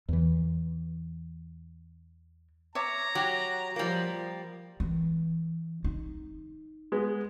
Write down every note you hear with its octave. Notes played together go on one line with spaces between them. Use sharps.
E2 E3
C#5 E5 A#5 D6
F#3 G4
F3 G3 A#3
E3
D#4
G#3 B3